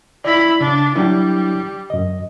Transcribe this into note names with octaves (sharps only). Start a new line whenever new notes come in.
E4 D5 B5
C#3 D4
F#3 G3 D4 E4
F#2 D#5